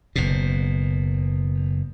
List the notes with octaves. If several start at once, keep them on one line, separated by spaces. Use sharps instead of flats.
F#1 B2